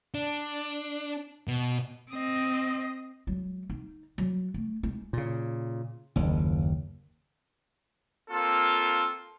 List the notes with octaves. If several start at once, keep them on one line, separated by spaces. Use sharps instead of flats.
D4
B2
C4 D#5
F#3 G#3
D#4
F#3
A3
G#3 D#4
A#2 C#3
F#1 D#2
A#3 C4 F4 A4